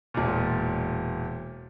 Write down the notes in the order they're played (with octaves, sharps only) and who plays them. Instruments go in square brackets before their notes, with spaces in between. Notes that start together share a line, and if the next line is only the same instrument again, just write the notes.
[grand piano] E1 A#2